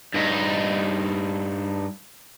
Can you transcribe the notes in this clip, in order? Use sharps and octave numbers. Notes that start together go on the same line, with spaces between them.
G2 D#4